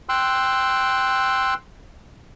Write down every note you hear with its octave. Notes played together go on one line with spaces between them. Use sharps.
G5 C6 E6 F#6